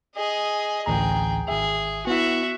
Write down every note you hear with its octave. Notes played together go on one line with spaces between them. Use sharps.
G#4 D#5
A1 D2 G#4 G5 A#5
G#1 G#4 E5
B3 E4 F#4 E5